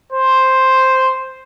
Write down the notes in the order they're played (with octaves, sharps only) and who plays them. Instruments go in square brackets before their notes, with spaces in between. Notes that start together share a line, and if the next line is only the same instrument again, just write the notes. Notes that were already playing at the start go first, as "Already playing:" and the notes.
[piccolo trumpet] C5